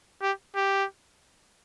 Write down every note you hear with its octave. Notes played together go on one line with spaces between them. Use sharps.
G4
G4